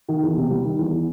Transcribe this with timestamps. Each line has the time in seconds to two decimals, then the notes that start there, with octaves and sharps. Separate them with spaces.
0.08 D#3
0.23 E2
0.37 C3
0.50 G3
0.65 D#3
0.79 E2
0.93 E3